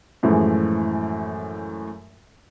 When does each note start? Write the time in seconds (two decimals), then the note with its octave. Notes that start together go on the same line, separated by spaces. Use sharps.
0.23 F#2 A2 E3 F3 G#3